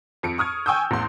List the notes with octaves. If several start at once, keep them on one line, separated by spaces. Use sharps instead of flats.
F2 C#7 D7
C#6 D#6 F6 G#6
G5 G#5 C#6 D#6 E6 G6
A1 E2 C6